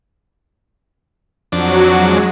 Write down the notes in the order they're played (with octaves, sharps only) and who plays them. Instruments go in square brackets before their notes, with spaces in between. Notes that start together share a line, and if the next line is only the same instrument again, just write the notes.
[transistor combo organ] F2 D4 [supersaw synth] F#3 F#4
[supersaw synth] G#3